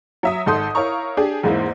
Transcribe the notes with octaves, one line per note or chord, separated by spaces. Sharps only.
F#3 E5 D#6
G#1 G#2 A4 C6 D#6 G6
E4 A#4 C#5 F5 A#5 C#6
D4 G4 G#4
E2 G#2 G#3 A#3 C4 E4